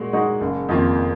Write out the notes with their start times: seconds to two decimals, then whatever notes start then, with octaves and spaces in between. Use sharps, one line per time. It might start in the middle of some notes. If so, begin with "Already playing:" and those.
Already playing: A#2 G#3 F#4
0.13 G#3 D#4 F#4
0.41 F#1
0.69 F2 D#3 A#3 F4